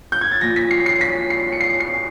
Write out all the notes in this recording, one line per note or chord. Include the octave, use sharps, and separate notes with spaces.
G6
G#6
A6
A#2 F3 A#6
B6
C7
C7
B6
C7
C#7
C7
C7